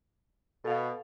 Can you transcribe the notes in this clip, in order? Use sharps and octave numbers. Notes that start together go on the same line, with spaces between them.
B2 A4 F5